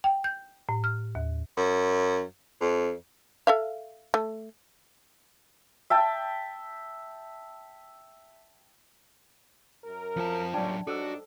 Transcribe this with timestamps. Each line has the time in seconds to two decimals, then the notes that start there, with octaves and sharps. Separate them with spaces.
0.04 G5
0.24 G6
0.69 A2
0.84 F6
1.15 D#2
1.58 F#2
2.61 F2
3.47 A4 E5 F5
4.14 A3
5.90 E5 G5 A5
9.84 F#2 A#4
10.16 F2 F3 A5
10.54 A#2 F#3 G3 C#4 D4 D5 G5 A5
10.87 F#2 G3 D4 D#4 F#4 A4 C5 E6